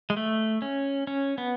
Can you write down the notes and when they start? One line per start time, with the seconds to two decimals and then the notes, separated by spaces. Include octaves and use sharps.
0.10 G#3
0.17 A3
0.62 C#4
1.07 C#4
1.38 B3